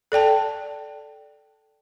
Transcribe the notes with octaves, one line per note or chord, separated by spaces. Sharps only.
A4 D5 G5 A5